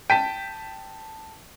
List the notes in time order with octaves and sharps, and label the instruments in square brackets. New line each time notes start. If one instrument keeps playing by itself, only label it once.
[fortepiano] G5 [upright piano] A5 B6 D#7